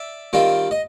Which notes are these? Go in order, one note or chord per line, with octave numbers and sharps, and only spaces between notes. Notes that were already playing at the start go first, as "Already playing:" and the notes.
Already playing: D5 E5
D#3 G3 C4 F4
D#5